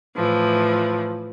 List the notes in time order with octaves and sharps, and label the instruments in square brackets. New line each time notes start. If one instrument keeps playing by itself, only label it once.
[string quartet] A2 E3 F3